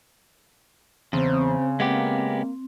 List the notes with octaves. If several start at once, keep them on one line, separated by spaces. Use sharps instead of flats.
E2 C#3 C4 C5
G#3 A#3 B3 G4